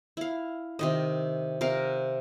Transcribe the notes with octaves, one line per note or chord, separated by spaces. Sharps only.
E4 F5
C3 D#3 D#5
C3 A#4 F5